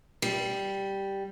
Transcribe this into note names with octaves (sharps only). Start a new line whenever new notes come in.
G3